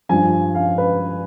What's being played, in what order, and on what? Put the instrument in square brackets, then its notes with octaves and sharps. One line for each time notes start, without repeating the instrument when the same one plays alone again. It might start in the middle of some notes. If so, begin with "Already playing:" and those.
[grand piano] G2 F3 G#5
F5
B4